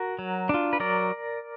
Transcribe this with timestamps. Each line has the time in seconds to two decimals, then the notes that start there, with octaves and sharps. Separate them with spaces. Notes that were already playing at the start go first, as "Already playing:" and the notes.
Already playing: F#4 A#4
0.19 F#3
0.49 D4 F4
0.73 B4
0.80 F#3 A#4 D5